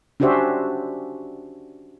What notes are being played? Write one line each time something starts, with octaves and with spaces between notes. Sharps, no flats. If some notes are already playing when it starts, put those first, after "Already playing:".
C#4 D4 F#4 G4 C5 E5